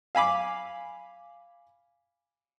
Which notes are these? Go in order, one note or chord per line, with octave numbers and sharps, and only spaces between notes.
F5 G#5 B5 D6